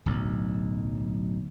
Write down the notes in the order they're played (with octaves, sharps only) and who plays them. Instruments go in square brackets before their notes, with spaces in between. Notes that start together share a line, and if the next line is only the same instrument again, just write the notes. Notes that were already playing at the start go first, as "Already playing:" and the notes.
[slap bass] D1 B1